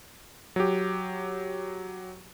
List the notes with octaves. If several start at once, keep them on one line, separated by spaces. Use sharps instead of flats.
F#3 G4